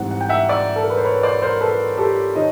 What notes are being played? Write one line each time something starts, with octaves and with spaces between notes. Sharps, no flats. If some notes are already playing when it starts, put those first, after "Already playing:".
Already playing: G#2 E3 G3 C4 F#5
F#5
G5
E5 F#5
D5 E5
A4
A#4
B4
C5
B4 C#5
C5 D5
A#4 C5
A4 B4
G4 A4
D#3 C#5 D#5